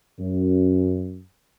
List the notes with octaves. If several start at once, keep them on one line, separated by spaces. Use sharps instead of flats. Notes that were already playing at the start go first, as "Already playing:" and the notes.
F#2